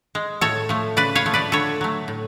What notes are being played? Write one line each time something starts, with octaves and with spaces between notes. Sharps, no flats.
G#3
A2 A4 C#5
F3 A3
C#3 B4 D5
C#5 F5
F3 A3
B4 D5
D3 A4 C#5
F#3 A3
A2